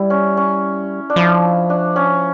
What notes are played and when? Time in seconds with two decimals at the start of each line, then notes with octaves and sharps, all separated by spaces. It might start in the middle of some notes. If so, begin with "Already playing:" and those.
Already playing: G3 E4
0.10 C#4
0.37 C#4
1.10 D4
1.16 F3 E4
1.70 D4
1.96 C#4